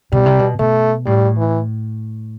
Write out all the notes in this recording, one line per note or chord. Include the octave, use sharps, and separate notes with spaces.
B2 G3
C3
B2
B2 A3
A2 G3
E3